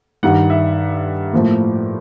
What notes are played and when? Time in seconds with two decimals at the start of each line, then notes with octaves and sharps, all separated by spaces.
0.23 G2 D#3 G3 F#5
0.50 E5
1.33 A2 F3 A#3